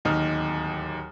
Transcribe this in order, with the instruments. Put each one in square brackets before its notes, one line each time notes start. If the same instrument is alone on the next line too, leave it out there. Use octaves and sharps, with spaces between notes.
[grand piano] D1 D#2 D#4 D#6 F6